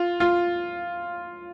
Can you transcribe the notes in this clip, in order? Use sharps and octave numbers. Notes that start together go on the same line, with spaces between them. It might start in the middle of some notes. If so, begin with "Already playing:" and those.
Already playing: F4
F4